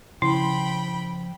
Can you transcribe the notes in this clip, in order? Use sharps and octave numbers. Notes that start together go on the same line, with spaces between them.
C#3 F3 E4 G5 B5